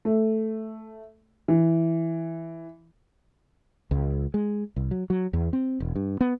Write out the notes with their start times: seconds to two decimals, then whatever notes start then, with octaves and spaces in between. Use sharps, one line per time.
0.05 A3
1.48 E3
3.91 C#2
4.34 G#3
4.76 C2
4.91 F#3
5.10 F#3
5.33 E2
5.53 C4
5.80 E1
5.96 G2
6.21 B3